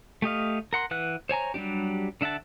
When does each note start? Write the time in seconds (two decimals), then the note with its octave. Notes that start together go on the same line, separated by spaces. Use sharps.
0.22 A3 G4 D#5 F5
0.73 A#4 F#5 C6
0.91 E3 B4 F#5 F#6
1.29 C5 C#5 G#5 A#5
1.54 F#3 G3 C#4 D4 G4
2.21 D3 D4 E5 F#5 A5